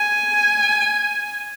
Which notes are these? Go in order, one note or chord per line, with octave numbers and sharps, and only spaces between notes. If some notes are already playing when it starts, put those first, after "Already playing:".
Already playing: G#5